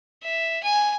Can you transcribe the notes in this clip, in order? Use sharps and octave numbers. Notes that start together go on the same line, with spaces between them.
E5
G#5